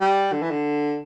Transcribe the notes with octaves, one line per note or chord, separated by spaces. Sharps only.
G3
D3
E3
D3